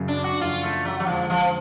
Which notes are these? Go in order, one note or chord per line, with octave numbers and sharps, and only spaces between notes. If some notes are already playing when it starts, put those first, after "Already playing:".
Already playing: F#2 C#3 F#3
D4
F#4
F#2 C#3 F3 F4
A3
F#3
F#3
F2 D3 F3 G#3 C#4
F3